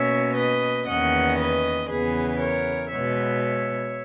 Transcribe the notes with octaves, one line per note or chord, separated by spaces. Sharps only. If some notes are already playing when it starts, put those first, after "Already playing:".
Already playing: B2 A#3 C#4 C#5 E5
B4 D#5
E2 D#3 A#3 C#4 D#5 F#5
B4 D#5
E2 C#3 E3 B3 G#4 B4
A#4 C#5
B2 G#3 B3 C#5 E5